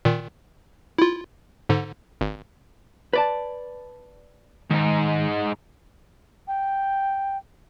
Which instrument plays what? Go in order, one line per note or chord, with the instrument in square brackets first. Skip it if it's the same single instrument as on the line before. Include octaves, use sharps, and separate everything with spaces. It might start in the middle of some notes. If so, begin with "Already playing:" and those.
[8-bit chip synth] A#2 D#3
E4 F4
G#2 D3
G#1
[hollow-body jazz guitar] B4 D5 A5
[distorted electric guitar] G#2 D#4 [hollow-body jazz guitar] D#3
[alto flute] G5